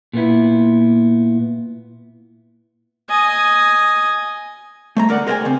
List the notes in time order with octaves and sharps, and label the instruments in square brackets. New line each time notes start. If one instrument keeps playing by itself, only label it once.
[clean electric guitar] A#2 B3 E4
[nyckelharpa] D#5 G#5
[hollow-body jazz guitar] A3 C5 A#5
D3 A#4 D5 F#5
G#4 A#4 C5 C#5 G5 G#5
C#3 C4